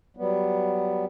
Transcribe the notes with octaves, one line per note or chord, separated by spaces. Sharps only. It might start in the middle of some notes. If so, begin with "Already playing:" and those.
F#3 G3 B3